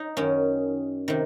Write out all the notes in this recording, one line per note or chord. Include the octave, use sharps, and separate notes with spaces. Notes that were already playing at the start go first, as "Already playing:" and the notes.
Already playing: D#4
F#2 D#3 C#4
C3 D#3